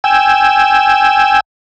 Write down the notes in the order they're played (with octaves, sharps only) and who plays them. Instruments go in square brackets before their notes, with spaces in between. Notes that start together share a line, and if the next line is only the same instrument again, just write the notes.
[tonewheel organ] G5 G#5 E6